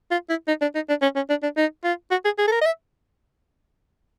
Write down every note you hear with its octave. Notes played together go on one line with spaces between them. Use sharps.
F4
E4
D#4
D4
D#4
D4
C#4
C#4
D4
D4
D#4
F4
F#4
G#4
G#4
A4
A#4
D#5
E5